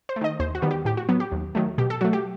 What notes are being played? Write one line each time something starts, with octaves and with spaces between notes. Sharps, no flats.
C5
A3
D#3 D#5
D#2 C5
F#4
D#3 G3 B3
G4
A2 G4
F#4
F#3 B3
G4
D#2
D#3 F#3 A3
B2 G4
A4
F#3 A3 F#4
G4